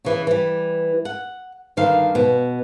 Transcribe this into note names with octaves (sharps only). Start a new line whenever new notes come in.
C#3 E3 E4
E3 G3
F#5
G2 D3 D#3 F5
B2